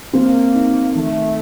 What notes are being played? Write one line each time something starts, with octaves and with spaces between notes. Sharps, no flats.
A#3 C4
D#4
D#3 A3